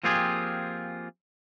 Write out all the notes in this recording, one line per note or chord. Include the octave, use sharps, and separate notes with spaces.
F3 A#3 C4 F4 G4 G#4